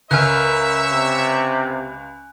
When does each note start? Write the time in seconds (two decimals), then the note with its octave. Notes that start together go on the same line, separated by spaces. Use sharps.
0.11 C#2 A#4 C#5 E5 G#5 F6 F#6
0.92 C3